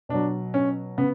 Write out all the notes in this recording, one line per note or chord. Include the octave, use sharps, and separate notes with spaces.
B2 F#3 D4
C#4
C#3 B3